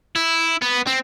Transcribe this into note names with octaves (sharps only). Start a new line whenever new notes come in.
E4
B3
C4